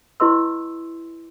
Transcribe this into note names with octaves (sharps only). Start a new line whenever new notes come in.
E4 G4 B4 D#5 C6 E6